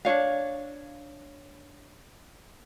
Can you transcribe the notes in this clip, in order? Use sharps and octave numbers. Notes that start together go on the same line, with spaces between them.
D4 D#4 C#5 F5